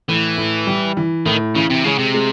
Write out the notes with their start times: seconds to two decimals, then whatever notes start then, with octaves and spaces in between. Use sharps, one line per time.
0.08 A2 E3
0.38 A2
0.67 G3
0.97 E3
1.26 A2 D#3
1.55 C#3 E3
1.70 C3
1.84 C#3 G#3
1.98 C3
2.14 G#3